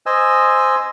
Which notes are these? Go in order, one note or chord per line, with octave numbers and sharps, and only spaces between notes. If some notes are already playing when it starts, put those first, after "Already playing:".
C5 D#5 G#5 E6